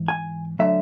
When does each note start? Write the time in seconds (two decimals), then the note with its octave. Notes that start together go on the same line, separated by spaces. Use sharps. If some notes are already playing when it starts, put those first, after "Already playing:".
Already playing: G#2 E3
0.08 G#5
0.59 D3 F#3 A3 E5